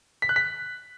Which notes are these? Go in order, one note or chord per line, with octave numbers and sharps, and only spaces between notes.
B6
F#6
B6